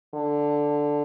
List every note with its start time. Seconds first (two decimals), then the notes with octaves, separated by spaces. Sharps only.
0.14 D3